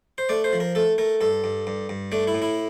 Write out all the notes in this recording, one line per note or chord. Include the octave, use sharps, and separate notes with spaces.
C5
A3 D5
C5
F3
A#4
A3 A4
A3 A#4
G2 A4
G2
G2
G2
A3 D4
E4
A2
E4